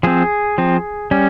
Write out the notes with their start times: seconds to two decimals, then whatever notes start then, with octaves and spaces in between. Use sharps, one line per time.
0.03 F3 C4 G#4
0.58 F3 C4
1.11 G3 C#4